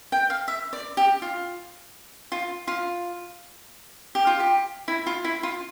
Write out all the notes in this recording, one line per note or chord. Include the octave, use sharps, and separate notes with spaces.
G5
F5
E5
D5
G4
F4
F4
F4
G4
F4
G4
E4
F4
E4
F4